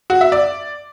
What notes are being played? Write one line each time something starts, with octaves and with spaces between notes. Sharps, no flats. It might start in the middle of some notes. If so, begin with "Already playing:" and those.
F#4
E5
D5